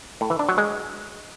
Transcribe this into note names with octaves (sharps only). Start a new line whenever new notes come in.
A2
E3
D4
F#3
G#3